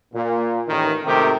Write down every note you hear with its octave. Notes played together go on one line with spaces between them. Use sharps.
A#2
A1 D#3
G#1 C3 D#3 A3 G4